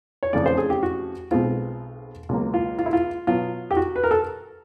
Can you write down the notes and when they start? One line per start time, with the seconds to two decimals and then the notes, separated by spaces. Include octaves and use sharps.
0.23 C#5
0.33 F2 C#3 E3 A3 C#4 D5
0.46 C5
0.58 G#4
0.70 G4
0.83 F#4
1.31 B1 B2 G#3 C4 F4
2.29 C#2 B2 F#3 A#3
2.54 F4
2.79 F4
2.86 E4
2.93 F4
3.27 B2 F#3 B3 F4
3.71 G4
3.77 F#4
3.96 B4
4.03 A#4
4.11 A4